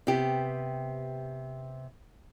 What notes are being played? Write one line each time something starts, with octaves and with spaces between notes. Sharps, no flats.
C3 B3 G4